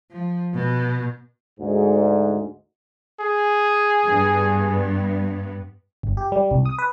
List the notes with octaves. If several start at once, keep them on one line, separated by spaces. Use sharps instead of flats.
F3
B2
D2 G#2
G#4
G2 B3
G1
G4
G3
C2
D#6
B4